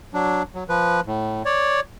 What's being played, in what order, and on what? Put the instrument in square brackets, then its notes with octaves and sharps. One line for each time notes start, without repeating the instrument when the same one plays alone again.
[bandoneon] F#3 D4
F#3
F3 B4
A2
C#5 D5